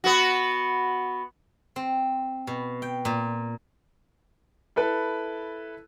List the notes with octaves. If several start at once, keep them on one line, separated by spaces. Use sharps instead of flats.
B3 F#4
C4
B2
G5
A#2
E4 A4 B4